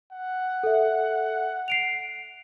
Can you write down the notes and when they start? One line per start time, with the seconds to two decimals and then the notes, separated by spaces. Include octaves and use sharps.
0.12 F#5
0.63 A4 E5
1.68 C7 D7 F7